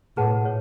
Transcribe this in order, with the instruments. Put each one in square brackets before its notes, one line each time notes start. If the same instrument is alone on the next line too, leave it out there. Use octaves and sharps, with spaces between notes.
[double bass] A2 [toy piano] G#4 B4 F#5 A5
[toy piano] G#4 C#5